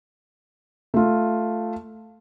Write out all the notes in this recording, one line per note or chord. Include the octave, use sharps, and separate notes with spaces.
A3 F4